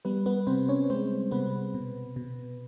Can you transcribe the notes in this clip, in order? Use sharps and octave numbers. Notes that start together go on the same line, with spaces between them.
G3 B3 B4
B3 B4
C3 C4 C5
C#4 C#5
G#3 C4 C5
C3 B3 B4
B2
B2